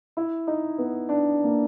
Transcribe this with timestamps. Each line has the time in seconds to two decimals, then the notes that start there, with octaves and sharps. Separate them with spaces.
0.17 E4
0.47 D#4
0.78 B3
1.09 D4
1.43 A#3